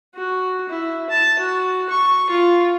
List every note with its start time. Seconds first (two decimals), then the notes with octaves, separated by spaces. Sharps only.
0.15 F#4
0.69 E4
1.10 A5
1.39 F#4
1.90 C#6
2.30 F4